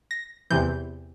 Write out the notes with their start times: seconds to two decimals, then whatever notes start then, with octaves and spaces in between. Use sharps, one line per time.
0.11 A#6
0.50 E2 C3 E3 G6